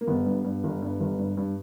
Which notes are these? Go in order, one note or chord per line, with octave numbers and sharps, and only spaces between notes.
A#3
G1 B3
G2
G2
G1
G2
G1
G2
G2